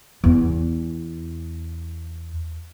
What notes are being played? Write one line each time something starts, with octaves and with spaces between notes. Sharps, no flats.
E2 E4